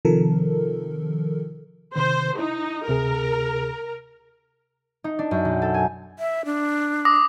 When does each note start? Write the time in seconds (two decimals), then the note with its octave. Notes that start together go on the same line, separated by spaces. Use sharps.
0.05 C3 D#3 F3 A4 A#4
1.96 C3 D#3 C5
2.39 D#4 E4
2.88 D2 C3 G#4 A#4
5.04 D#4
5.19 D4
5.31 F#2
5.45 B1
5.62 A4
5.74 G#5
6.19 E5
6.45 D4
7.05 D6 D#6 A#6